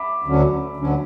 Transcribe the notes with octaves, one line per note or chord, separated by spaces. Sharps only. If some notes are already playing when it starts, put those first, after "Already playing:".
Already playing: E5 B5 D6
D2 D3 F#3 C#4
D2 D3 F#3 C#4